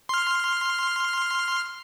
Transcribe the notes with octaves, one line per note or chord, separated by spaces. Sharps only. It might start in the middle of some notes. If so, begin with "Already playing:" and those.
C6 F6